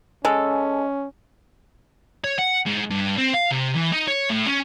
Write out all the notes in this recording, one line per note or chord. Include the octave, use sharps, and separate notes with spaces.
G#3 C#4 A4
C#5
F#5
G#2
G2
C4
F5
C3
E3
D#4
C#5
A2
C#4